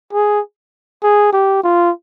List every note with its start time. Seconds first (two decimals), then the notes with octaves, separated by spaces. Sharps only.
0.13 G#4
1.03 G#4
1.33 G4
1.63 F4